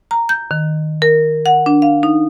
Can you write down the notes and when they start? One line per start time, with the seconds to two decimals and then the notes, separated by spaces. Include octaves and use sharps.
0.11 A#5
0.29 G6
0.51 D#3
1.02 A#4
1.46 F#5
1.66 D4
1.82 F5
2.03 D#4